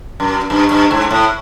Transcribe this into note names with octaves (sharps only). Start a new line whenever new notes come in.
F#2
G2
G2
G#2
A2